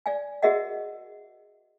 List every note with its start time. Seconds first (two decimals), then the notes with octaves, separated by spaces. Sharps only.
0.06 D5 F5 G#5
0.42 F#4 G#4 A#4 D#5 E5 F#5